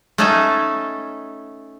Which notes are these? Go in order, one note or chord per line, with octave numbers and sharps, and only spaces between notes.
A3 C#4 D#4 A4 E5 G#5